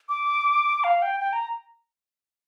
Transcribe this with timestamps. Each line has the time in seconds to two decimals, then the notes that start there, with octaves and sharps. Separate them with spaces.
0.09 D6
0.84 F5
1.02 G5
1.20 G5
1.33 A#5